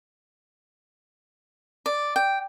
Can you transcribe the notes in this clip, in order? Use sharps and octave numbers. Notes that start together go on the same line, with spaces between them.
D5
G5